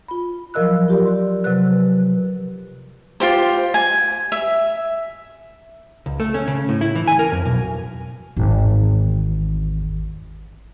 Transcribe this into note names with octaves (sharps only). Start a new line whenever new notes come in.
F4 B5
F3 F#3 A#4 D#5 E6 F#6
F4 G4 A#4 D5
C6
C3 F#3 B4 F#6
F4 G4 C5
G#5
E5
C#2
A3
C#4
C#3
A2
E4
E3
G#5
A#4
F2
B1
G#1 E2